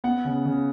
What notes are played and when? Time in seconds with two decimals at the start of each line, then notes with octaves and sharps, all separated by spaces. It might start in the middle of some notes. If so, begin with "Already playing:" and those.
0.04 B3 F#5
0.25 C#3
0.45 C#3